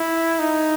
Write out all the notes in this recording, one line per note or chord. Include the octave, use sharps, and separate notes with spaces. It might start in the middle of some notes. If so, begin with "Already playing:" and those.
Already playing: E4
D#4